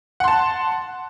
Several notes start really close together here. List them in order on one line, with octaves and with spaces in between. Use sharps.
F#5 C6 A5